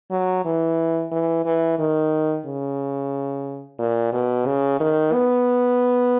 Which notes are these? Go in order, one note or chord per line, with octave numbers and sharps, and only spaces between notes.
F#3
E3
E3
E3
D#3
C#3
A#2
B2
C#3
D#3
B3